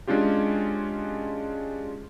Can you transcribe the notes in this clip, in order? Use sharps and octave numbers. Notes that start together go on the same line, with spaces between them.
G#3 C#4 D4 F4 G4